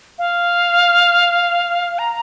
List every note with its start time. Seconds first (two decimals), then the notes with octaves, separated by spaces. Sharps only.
0.18 F5
1.99 A#5